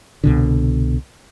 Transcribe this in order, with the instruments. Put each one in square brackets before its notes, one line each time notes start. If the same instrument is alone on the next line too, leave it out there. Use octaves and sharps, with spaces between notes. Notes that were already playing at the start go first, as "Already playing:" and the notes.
[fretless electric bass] C2 B2 D3